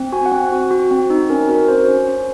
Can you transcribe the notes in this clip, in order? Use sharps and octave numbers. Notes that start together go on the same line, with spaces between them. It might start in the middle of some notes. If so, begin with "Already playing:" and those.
Already playing: C4
F#4 G#5
F#5
C4
F#4
F#4
C4
D#4
C#4 A#4
F#4 A#4
F#4 C5
C#4
C#4